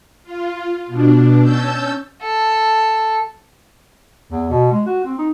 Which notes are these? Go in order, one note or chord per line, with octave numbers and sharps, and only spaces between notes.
F4
B2 D4
C#4 A5 E6 G6
A4
E2
B2
G#3
F#4
C4
D#4